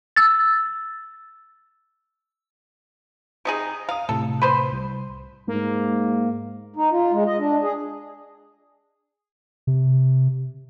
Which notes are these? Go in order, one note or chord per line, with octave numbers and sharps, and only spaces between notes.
E6 A6
C3 D#4 G#4
F5 A#5 D#6
A2 C3 A4
B4 C5 C6
C2
G#2 A#3
D#4
F4
G#3
D#5
D4
G#4
C3